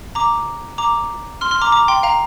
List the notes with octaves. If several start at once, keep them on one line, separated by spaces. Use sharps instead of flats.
A#5 D6
A#5 D6
C6 F6
C6 F6
A#5 D6
A#5 D6
G5 C6
F5 A#5